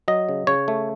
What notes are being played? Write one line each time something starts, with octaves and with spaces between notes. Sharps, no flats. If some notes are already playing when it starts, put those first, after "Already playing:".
F#3 D#5
C#3
C#3 C#5
A3